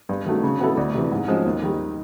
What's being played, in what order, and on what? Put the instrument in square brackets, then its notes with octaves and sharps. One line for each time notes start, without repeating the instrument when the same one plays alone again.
[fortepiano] G2
D#3 F#3 A3 D4
C#3
F#3 B3 E4 A4
D2
C3 E3
G#2
F3 G#3 C#4
D#2
D#3 G3